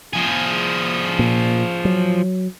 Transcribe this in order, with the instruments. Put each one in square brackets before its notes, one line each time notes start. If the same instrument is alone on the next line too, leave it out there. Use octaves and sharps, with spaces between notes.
[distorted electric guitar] F3 G#4
[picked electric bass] A#2
F#3